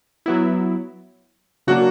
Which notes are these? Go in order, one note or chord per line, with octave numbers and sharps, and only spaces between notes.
F#3 B3 E4
C#3 F#3 A#3 D4 F#4